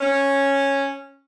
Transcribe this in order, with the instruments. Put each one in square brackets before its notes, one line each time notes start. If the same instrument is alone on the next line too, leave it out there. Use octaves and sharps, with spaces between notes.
[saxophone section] C#4